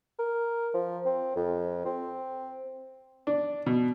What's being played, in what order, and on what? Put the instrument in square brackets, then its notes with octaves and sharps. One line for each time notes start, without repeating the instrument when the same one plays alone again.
[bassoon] A#4
F3
C4
F2
C4
[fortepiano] D4
B2